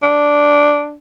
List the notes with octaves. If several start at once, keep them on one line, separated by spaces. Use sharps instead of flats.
D4